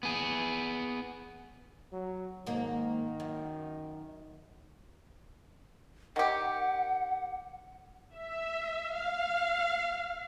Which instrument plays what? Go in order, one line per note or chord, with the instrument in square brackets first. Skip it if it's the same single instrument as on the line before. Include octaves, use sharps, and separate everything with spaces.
[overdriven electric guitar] B3 G#4
[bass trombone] F#3
[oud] G#2 A#3 [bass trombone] D#3
[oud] F#2
[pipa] D#3 G4 [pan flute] F#5
[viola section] E5
F5